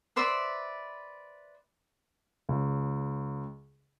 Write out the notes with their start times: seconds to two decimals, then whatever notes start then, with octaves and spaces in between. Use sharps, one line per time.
0.16 B4 C5 D5 E5
2.49 C#2